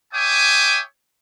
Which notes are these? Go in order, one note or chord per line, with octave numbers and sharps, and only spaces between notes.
C#5 E5 G5 G#5 D6 D#6